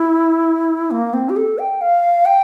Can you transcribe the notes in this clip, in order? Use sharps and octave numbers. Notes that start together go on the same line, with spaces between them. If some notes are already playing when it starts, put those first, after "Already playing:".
Already playing: E4
A#3
C4
G4
A4
G5
F5
G5